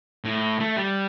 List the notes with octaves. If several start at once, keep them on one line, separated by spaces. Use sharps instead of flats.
A2
A3
G3